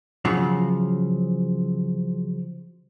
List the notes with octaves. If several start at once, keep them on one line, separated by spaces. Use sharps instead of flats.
C#3 F3 F#3